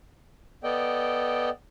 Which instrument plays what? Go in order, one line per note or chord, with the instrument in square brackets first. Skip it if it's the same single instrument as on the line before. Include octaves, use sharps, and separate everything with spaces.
[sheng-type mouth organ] B3 A4 D5 D#5 G5